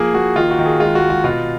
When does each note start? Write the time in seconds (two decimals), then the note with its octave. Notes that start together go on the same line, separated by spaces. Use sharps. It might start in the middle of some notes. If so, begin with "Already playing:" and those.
Already playing: F3 A#3 G#4
0.14 A#3 F#4
0.36 D#3 F4
0.50 F#4
0.59 D#3
0.66 G#4
0.80 G#3 F4
0.95 F#4
1.02 G#3
1.10 F#4
1.24 B2 F4